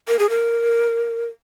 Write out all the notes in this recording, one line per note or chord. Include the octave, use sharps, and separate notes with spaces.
A#4
G#4
A#4